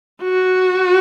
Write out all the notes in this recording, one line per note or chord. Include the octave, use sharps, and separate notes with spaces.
F#4